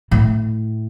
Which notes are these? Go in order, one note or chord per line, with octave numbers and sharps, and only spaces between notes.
A2